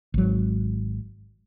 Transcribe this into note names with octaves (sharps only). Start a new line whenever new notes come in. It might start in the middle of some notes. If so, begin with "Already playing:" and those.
G#1 F#3